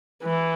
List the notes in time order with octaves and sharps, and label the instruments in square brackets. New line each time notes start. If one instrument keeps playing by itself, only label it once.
[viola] E3